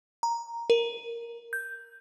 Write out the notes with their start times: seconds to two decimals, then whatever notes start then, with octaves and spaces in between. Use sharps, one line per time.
0.23 A#5
0.70 A#4
1.53 G6